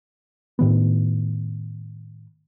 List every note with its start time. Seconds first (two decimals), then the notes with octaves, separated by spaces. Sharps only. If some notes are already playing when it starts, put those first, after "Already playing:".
0.59 A2 D#3 B3